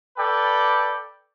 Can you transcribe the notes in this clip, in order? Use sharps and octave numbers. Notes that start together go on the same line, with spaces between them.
A4 B4 D5 G5